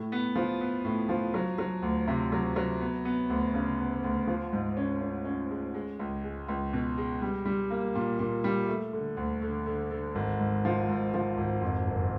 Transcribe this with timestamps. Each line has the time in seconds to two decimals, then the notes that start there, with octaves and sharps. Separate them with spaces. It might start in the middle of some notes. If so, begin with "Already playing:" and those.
Already playing: A2
0.12 B3
0.35 F3
0.61 B3
0.85 A2
1.09 F3
1.34 F#3
1.58 F#3
1.82 D2
2.07 C3
2.32 F#3
2.56 F#3
2.81 B3
3.05 B3
3.30 D2
3.54 C#3
3.79 B3
4.04 D2
4.27 F3
4.53 G#2
4.77 C#4
5.01 C#4
5.25 C#4
5.50 G#3
5.74 G#3
5.99 C#2
6.24 G#3
6.48 C#2
6.73 B2
6.98 G#3
7.22 G3
7.45 G3
7.70 A#3
7.95 A#2
8.19 A#2
8.44 G3
8.68 A3
8.93 D3
9.17 D2
9.42 D3
9.66 D3
9.91 D3
10.15 G#1
10.40 G#2
10.65 F3
10.88 G#2
11.14 F3
11.37 G#1
11.62 F2
11.86 F#1